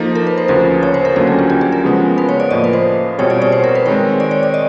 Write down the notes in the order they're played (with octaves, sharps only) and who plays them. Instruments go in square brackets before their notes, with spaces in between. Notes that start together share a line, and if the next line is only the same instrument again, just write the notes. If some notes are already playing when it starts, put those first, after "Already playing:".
Already playing: [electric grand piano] F3 A#3 D#4 [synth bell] A4
[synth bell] A#4
B4
C5
[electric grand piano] D2 C#3 F3 [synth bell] B4
[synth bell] C#5
C5
A#4
[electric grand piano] D2 D3 F#3 A#3 C#4 [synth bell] A4
[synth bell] G4
F4
G4
G#4
A#4
[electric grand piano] C#3 F3 G#3 B3
[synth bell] B4
C#5
D5
[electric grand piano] A2 F3 A#3 [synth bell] D#5
[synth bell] B4
C5
[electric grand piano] B2 G3 C4 F4 G#4 [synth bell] C#5
[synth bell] D5
C#5
C5
A#4
B4
[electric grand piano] D#3 G#3 C4 [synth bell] C#5
[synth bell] D5
C#5
D5
D#5